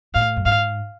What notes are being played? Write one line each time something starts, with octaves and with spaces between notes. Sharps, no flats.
A2 F5
F#2
G#2 F5